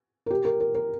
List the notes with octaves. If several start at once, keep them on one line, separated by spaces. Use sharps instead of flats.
A#4
G4
A#4
A#4
A#4